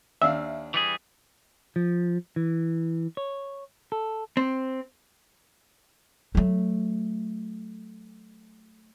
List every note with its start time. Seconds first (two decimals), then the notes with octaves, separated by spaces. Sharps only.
0.21 D#2 D4 E5 F5
0.74 E3 G3 G#4
1.76 F3
2.36 E3
3.17 C#5
3.92 A4
4.37 C4
6.35 F#3 A3